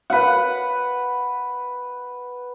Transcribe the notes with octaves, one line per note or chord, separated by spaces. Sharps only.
B4 F#5